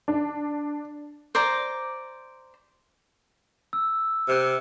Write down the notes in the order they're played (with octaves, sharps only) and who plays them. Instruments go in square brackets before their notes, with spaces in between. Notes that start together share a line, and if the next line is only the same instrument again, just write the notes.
[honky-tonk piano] D4
[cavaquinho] C5 D5 A#5 D6
[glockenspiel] E6
[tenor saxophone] C3 [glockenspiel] F6 F#6